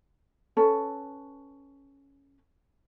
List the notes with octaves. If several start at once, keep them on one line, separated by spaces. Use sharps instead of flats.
C#4 A4 B4